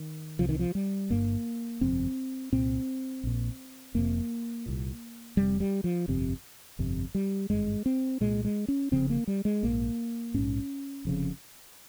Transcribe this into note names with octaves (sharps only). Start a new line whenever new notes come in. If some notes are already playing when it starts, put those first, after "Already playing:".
Already playing: D#3
C2 C3 F3
D#3
F3
G3
G1 G2 A#3
G1 F2 C3 C4
C2 A#2 C4
A#1 A#2
F1 F2 C3 A#3
C2 A#2
F1 F2 C3 G3
G3
F3
G1 F2 C3
G1 F2 C3
G3
G#1 G2 G#3
C4
C2 A#2 G#3
G#3
C#4
F1 F2 C#3 C4
A#3
G3
G#3
A#1 G#2 A#3
A#1 G#2 C#4
F1 F2 C#3